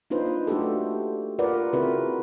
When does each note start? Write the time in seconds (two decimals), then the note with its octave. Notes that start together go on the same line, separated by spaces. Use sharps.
0.10 A#3 D4 D#4 F4 B4 C5
0.47 A3 D4 F#4 G4 A4
1.39 F4 A#4 B4 D5 F#5
1.73 C#3 C4 E4 F#4 A#4 B4